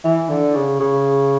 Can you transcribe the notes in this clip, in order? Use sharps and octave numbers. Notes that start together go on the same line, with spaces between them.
E3
D3
C#3
C#3